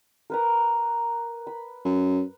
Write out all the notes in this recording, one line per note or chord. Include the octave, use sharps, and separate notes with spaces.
A#4 B4 A#5
B5
F#2